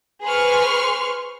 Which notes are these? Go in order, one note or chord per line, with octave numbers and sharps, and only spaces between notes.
G#4 B4 C5 C6 C#6 F6